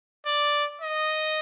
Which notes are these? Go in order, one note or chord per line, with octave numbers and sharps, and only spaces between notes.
D5
D#5